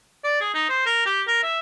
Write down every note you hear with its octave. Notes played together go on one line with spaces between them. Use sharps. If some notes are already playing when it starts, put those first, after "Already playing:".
D5
G#4
D#4
C5
A#4
G4
A#4
E5